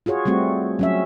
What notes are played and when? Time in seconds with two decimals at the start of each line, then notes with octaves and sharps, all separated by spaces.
0.06 F4 F#4 G#4 C#5
0.26 G3 A3 C4 F#4
0.79 F#3 C#4 E5